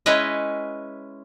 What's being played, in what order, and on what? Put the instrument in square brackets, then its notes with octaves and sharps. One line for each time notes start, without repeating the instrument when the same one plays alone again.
[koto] G#3 C#4 E4 B4 C#5 D#5